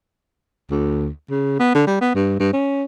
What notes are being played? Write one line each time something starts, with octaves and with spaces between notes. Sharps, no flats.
D2
C#3
B3
D3
G3
B3
G2
G2
C#4